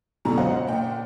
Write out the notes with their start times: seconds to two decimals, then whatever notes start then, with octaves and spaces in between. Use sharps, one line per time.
0.25 C#2 F#2 B2 D3 A#5
0.38 C5 D#5 F5 F#5
0.67 A#2 G5